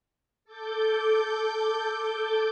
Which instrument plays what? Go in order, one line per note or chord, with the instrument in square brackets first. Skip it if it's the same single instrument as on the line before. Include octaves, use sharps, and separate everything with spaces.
[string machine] A4 D6 G6